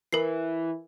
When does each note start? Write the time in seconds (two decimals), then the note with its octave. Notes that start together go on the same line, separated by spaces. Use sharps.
0.13 E3 A#4 C7